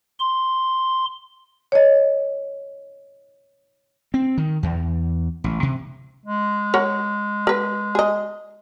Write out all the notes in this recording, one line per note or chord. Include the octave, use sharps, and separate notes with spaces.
C6
C#5 D#5
C4
D#3
E2
A1
C3
G#3
A#4 C#5 F#5
A#4 B4
G#4 D#5